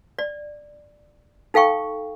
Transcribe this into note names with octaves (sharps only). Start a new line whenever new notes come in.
D5
D#4 A4 F5 G5 C#6